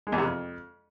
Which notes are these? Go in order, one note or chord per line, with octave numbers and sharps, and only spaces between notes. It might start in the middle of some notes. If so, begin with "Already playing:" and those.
G#3
E2
C3
F2